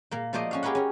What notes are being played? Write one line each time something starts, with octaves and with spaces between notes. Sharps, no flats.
A#2 A#3
F3 A3 A#3 C5 D5 D#5
C#4 F#4 F5
G4 G#4 A#4 B4 C#5 F#5
C#4 A#4